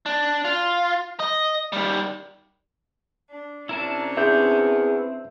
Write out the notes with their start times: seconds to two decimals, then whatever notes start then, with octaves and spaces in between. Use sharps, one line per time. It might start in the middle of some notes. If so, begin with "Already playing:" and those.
0.06 D4
0.45 F4
1.20 D#5
1.73 D#3 G3
3.29 D4
3.69 C3 C#4 D4 E4 A#4 A5
4.17 E2 C4 E5 G6